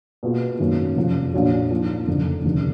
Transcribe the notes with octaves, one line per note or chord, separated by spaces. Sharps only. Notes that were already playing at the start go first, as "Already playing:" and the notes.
B2 A#3 F4 G#4
G#1 F#2 D#3 A#3
F1 F2 F3
A#1 A#2 F#3
G#2 F3 A#3
F#1 F2 D3 F3
F1 D#2 D3